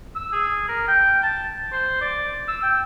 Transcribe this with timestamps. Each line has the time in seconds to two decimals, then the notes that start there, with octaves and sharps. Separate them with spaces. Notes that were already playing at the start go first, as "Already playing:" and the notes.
0.15 E6
0.32 G#4
0.68 A#4
0.88 G5
1.23 A5
1.72 C5
2.01 D5
2.48 E6
2.63 G5